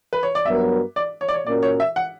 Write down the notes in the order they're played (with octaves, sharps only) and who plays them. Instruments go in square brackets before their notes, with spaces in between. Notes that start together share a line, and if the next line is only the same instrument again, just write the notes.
[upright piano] B4
C#5
D5
[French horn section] G2 F#3 B3 F#4 A#4 [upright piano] E5
[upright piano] D5
C#5
D5
C#5
[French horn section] A#2 A#3 C#4 F#4 A#4 [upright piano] D5
[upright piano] C#5
E5
F#5